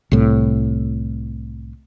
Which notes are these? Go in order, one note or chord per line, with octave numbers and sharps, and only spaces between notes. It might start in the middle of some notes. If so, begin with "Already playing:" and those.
C2 A2